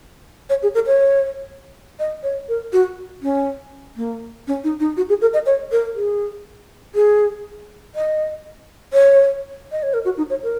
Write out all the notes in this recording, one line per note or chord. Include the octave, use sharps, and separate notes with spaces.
C#5
G#4
A#4
C#5
D#5
C#5
A#4
F#4
C#4
A#3
C#4
D#4
D#4
F#4
G#4
A#4
D#5
C#5
A#4
G#4
G#4
D#5
C#5
D#5
C#5
A#4
F#4
D#4
C#5
A#4